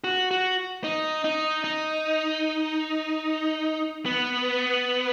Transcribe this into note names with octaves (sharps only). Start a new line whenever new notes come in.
F#4
F#4
D#4
D#4
D#4
B3